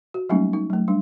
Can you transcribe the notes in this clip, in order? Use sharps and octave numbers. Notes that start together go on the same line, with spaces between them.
F#4
F#3 G3 A3 A#3 C#4 D#4
D#4
F#3 A3
G3 D4